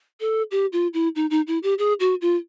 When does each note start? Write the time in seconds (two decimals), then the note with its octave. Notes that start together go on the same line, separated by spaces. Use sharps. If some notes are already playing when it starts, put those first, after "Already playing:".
0.20 A4
0.51 G4
0.73 F4
0.94 E4
1.16 D#4
1.30 D#4
1.47 E4
1.63 G4
1.79 G#4
2.00 F#4
2.22 F4